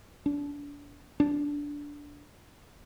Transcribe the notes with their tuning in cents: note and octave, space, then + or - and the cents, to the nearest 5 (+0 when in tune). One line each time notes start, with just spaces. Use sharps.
D4 -30
D4 -15